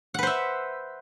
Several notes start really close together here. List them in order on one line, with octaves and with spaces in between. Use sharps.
F#5 B4 C5 E5